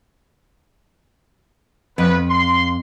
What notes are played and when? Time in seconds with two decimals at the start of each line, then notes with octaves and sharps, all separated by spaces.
1.98 F2 B3 B4
2.30 C6